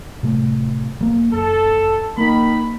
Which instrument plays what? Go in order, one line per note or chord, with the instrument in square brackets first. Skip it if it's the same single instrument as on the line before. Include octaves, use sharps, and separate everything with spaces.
[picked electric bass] A2 C3 A3
B1 G3 A#3
[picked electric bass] F#1 [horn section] A4
[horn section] D#3 B5 [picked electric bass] A#3